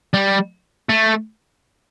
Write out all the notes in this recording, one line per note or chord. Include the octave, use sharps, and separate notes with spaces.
G3
A3